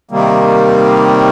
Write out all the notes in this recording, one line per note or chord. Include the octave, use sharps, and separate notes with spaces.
C3 D#3 G3 A#3